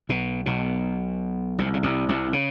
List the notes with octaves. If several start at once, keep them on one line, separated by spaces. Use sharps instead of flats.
B1 B2
B1 B2
C2 C3
C#3
C2 C3
C2 C3
C#3